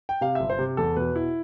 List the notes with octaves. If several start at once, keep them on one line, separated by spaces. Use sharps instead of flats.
G5
C3 F5
G1 E5
C5
C3
E2 A4
B2 B4
E4